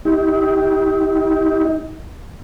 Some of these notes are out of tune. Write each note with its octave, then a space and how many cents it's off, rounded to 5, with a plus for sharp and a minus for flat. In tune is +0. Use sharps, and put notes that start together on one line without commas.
D#4 +40 G4 +0